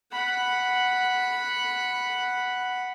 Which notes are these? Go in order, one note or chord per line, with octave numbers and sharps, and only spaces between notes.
F#5 B5